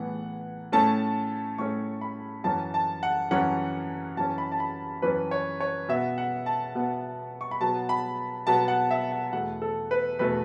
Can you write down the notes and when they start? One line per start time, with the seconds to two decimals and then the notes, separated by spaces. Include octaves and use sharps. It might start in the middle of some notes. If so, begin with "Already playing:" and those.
Already playing: A2 E3 B3 F#5
0.72 A2 A3 C#4 A5
1.58 A2 A3 C#4 C#6
2.01 B5
2.44 F#2 E3 C#4 A5
2.74 A5
3.03 F#5
3.31 F#2 E3 C#4 F#5
4.17 F#2 E3 C#4 A5
4.38 B5
4.52 A5
4.60 B5
5.02 F#2 E3 C#4 B4
5.31 C#5
5.60 C#5
5.88 B2 B3 E5
6.18 F#5
6.46 A5
6.75 B2 B3
7.41 C#6
7.51 B5
7.61 B2 F#3 B3 A5
7.89 B5
8.47 B2 F#3 B3 A5
8.68 F#5
8.91 E5
9.12 F#5
9.33 E2 B2 A3 F#5
9.62 A4
9.91 B4
10.19 E2 B2 A3 B4